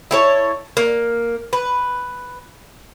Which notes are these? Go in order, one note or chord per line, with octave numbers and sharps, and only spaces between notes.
E4 A4 C#5
A#3
B4